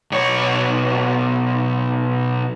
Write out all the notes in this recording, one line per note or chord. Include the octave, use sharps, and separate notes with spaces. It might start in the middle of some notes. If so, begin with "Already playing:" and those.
B1 C#5